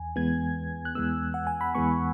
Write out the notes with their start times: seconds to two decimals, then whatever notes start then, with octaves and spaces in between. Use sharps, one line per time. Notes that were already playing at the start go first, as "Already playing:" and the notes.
Already playing: E2 G#5
0.16 E2 E3 G#3 B3 G#6
0.85 F#6
0.95 E2 E3 G#3 B3 E6
1.34 F#5
1.47 G#5
1.61 B5
1.75 E2 E3 G#3 B3 C#6